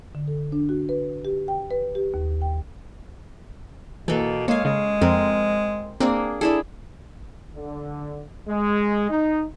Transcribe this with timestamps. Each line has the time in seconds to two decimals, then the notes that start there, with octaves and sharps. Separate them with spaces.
0.15 D3
0.28 A4
0.52 D4
0.69 F#4
0.89 B4
1.25 G4
1.48 G5
1.71 B4
1.95 G4
2.14 D#2
2.42 G5
4.08 B2 E3 A#3 A4
4.48 G#3 A#3 C#5 F5
4.65 C#3 G#3
5.01 F2 C4 A#4
6.00 A#3 C4 D4 G#4
6.41 D4 E4 G#4 A4
7.55 D3
8.49 G#3
9.10 D#4